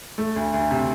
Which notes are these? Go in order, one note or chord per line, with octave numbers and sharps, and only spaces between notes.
A3
D2
D2
C3